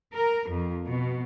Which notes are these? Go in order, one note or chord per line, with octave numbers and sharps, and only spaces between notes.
A#4
F2
B2